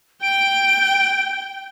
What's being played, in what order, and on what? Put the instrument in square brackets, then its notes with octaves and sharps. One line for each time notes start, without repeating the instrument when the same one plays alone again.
[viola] G5 [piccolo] D7